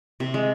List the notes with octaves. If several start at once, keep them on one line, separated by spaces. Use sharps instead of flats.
C3
G#3